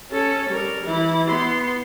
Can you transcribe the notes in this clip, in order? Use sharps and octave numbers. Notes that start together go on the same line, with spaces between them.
C#4 A4
G3 A#4
E3 E4
B3 C6